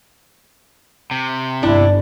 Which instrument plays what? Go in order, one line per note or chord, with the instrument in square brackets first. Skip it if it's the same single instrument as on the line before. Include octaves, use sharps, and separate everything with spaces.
[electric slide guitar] C3
[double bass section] G1 [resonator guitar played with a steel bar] D4 [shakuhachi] E4